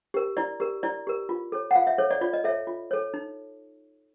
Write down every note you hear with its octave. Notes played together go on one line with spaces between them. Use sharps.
G4 A#4
E4 D5
G4 A#4
E4 D5
G4 A#4
F4
A4 C#5
F#5
F4 F5
E5
A4 C#5
D5
F4 D5
D#5
A4 C#5 E5
F4
A4 C#5
D#4